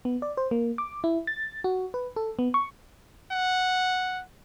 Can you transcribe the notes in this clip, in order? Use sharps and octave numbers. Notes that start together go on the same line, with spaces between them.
B3
D5
C5
A#3
D6
E4
A6
F#4
B4
A4
B3
C#6
F#5